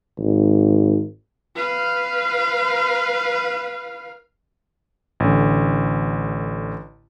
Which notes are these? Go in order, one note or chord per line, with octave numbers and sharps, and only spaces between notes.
G#1
B4 F5
A1 D3